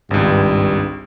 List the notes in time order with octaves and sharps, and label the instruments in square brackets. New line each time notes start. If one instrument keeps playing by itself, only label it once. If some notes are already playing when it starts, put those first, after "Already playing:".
[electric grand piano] G#1 C#2 [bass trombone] G2